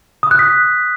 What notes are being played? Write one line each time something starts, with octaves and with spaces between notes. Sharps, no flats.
D#6
F#6
B6